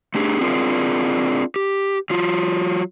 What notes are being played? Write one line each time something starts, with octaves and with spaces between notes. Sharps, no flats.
A3 D4 G4 G#4
C4 D4 F4 G#4 A#4
G4
F#3 F4